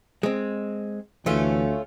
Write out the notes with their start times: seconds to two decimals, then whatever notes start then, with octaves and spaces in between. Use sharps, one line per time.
0.23 G#3 C4
1.26 D2 E3 A3 C#4 F4